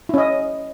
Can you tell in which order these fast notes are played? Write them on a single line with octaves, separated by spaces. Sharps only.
E4 C#4 D#5